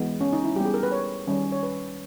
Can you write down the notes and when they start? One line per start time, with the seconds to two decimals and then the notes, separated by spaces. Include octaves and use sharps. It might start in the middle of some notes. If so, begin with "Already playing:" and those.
Already playing: E3 G#3 B3
0.21 C#4
0.33 D#4
0.44 E4
0.56 G3 B3 G4
0.65 G#4
0.74 A#4
0.83 B4
0.92 C#5
1.28 D#3 G3 C#4
1.52 C#5
1.63 B4